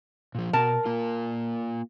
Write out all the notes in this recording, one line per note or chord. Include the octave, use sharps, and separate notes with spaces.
A#2 F3
B2 A#4 A5
A#3 F4